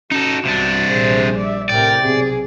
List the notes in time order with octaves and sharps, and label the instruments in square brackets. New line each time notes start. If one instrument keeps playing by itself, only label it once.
[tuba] C#4 [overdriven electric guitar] D#4 A4 [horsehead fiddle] F#4
[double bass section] B1 [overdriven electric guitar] C3 D4 [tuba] G3
[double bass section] A#1 [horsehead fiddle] G#4 C5
[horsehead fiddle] D5 E5
[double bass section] A2 C3 [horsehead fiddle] A#4 G5 [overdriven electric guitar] D5
[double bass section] B1 [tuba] C3 [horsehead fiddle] G#4